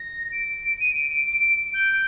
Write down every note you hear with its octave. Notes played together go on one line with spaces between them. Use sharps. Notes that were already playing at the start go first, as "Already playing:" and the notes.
Already playing: A#6
D7
D#7
D7
D7
D7
G6